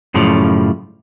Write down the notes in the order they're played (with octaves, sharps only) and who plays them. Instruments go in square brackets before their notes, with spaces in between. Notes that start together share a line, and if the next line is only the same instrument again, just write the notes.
[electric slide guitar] F#2 A2 C#3 F3 G3